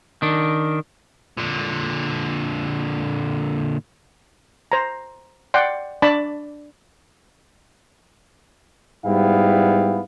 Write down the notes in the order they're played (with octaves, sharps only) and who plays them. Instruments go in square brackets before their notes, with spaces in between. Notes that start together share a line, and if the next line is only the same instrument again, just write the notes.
[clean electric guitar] D#3 D4
[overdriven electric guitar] A#2 D3
[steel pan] C5 A#5
D5 F#5 G5 C6
D4 D5 A5 B5
[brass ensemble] G#2 G3 B3 E4 F5 G5